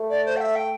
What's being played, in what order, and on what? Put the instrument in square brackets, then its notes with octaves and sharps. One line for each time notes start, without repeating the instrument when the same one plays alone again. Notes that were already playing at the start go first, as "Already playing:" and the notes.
Already playing: [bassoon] A3
[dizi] D5
C5
G5
E5
G5